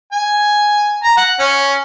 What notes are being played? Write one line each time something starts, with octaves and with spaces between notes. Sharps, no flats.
G#5
A#5
F#5
C#4